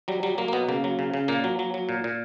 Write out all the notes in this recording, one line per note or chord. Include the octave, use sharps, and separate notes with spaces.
F#3 G3
F#3 G3
F#3 A#3
A#3
B2 B3
C#3 A#3
F#3
C#3
C#3
A#2 A#3
F#3
F#3
F#3
A#2
A#2